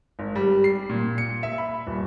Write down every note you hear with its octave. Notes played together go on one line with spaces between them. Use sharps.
G#1
G3
C7
A#2
C#7
E5
B5
D#1